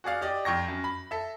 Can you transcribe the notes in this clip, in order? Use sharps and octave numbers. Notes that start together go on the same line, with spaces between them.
F#4 G#4 D5 F5
G4 D5 D#5
F2 G5 C#6 A#6
F#2
B5
A4 E5